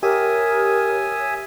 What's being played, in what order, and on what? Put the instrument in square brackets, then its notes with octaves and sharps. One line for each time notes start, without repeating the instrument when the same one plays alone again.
[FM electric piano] G4 C#5 [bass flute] A#4 [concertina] E5 G#5 D#6